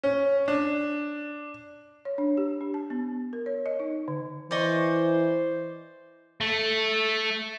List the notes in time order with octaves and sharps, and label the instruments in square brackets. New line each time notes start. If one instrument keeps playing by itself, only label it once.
[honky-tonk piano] C#4
D4
[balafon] C#5
D4
G4
D4
A5
B3
A#4
C#5
D#5
D#4
D3
[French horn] E3 [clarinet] C5 [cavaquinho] D5 D#5 C#6
[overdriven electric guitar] A3